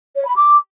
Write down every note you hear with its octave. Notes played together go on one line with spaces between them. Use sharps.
C#5
B5
D6